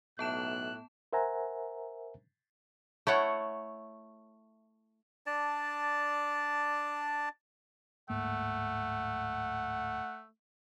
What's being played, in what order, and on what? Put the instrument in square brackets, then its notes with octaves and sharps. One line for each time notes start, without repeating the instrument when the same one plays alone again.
[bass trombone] B1 [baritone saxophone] A2 [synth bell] B3 A5 E7 [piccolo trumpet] F#6
[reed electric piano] A#4 C5 E5 F#5 G#5 A#5
[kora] A3 E4 C#5 F#5
[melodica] D4 D5 A5
[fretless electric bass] D1 G#2 A#3 [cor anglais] A3 [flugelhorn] F#5